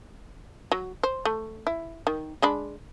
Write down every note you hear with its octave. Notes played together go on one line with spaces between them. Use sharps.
F#3
C5
A3
E4
D#3
G#3 D4 B5